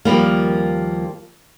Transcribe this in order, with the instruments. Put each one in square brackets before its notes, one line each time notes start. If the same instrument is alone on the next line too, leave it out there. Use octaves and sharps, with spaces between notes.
[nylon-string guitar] D#2 F3 G3 A#3